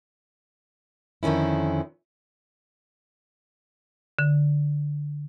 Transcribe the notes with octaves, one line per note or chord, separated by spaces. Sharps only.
F2 D3 D#3 C#4 E4
D3